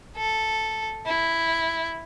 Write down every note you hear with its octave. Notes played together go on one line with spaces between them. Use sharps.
A4
E4